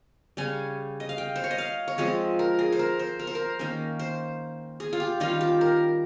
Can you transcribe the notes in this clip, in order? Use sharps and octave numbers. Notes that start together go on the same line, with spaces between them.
C#3 G3 C#4 G#5
D#5
F5
G5
C5
C#5
D#5
F5
C#5
F3 G#3 C4 D#5
A#4
G#4
C5
A#4
C5
A#4
C5
A#4
D#3 A#3 C#4
C5
G#4
F4
G4
D#3 G3 C#4 F4
G4
A#4